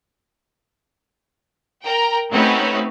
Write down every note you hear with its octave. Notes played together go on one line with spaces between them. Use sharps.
A#4 G5 A#5
A3 C4 C#4 D#4 F#4 B4